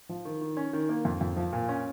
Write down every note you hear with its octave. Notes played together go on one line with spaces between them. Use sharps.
F3
D#3
D#3
C#4
D#3
A#3
F2
F2
F3
A#2
C#4